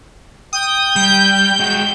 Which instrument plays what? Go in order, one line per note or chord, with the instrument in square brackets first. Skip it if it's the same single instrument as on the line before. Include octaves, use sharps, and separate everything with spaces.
[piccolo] G5 [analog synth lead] D#6
[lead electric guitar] G3 [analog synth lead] G6
[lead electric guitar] G#3 F#4 [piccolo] G5